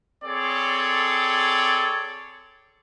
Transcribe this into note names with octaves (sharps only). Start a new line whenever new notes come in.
C4 G#4 A4 C#5 D5